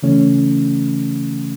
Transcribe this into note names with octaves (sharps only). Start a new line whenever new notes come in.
C#3 E3 A3 C#4